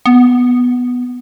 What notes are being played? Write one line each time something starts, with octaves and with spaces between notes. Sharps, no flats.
B3